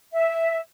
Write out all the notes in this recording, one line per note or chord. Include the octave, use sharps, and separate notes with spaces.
E5